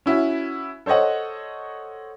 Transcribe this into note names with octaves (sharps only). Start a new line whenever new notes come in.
C#4 E4 F#4
A4 C5 C#5 D#5 F#5